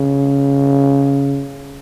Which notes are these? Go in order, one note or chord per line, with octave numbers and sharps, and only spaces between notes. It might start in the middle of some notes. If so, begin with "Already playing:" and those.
Already playing: C#3